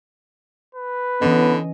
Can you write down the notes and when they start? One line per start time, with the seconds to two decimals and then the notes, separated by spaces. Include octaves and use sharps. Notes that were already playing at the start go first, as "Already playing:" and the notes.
0.75 B4
1.21 D3 E3 B3 C#4 D#5